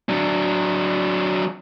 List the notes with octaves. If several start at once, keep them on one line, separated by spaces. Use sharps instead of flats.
F#3 D4